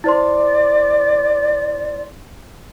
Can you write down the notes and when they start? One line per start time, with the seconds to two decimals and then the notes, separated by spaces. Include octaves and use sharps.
0.04 E4 C5 D5 C6